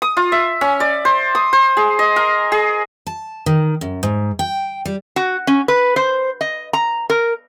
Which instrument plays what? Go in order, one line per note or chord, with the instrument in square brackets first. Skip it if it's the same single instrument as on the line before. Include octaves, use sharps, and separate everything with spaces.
[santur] D#6
F4
E5
C#4
D5
C5
D#6
C5
G#4
D#5
A#4
G#4
[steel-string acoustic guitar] A5
D#3
F#2
G#2
G5
G3
[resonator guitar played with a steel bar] F#4
C#4
B4
C5
D#5
A#5
A#4